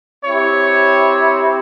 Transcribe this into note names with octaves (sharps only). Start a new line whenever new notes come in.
C4 E4 G4 C#5